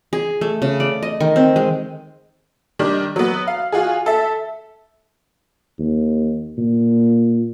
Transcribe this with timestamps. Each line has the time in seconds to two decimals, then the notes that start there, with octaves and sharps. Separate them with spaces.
0.13 G#4
0.41 A3
0.62 C#3
0.80 D5
1.03 D#5
1.20 D#3
1.36 C4
1.56 G#3
2.79 D#3 G3 D4
3.16 F#3 B3
3.47 F5
3.72 F4 F#4 G#4
4.06 A4 E5
5.79 D#2
6.58 A#2